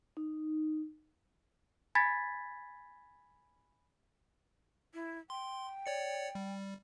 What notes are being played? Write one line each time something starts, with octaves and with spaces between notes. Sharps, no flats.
D#4
G#5 B5 G#6 A6 B6
E4
G5 C6
C#5 D5 C#7
G3